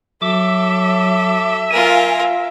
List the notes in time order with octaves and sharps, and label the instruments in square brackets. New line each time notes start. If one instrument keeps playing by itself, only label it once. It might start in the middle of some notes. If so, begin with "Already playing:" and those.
[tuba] F#3 [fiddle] A4 [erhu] E5 [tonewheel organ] D6
[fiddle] F4 A#4 [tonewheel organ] G#5